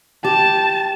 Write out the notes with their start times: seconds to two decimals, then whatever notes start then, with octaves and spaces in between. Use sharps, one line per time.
0.24 G4 A5